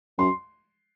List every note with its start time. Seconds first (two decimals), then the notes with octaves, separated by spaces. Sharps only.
0.18 F#2 C6